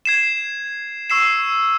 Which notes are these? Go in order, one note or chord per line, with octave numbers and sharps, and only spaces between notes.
G#6 C7 E7
C#6 E6 C7 E7